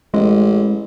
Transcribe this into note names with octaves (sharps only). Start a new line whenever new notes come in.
A1 G#3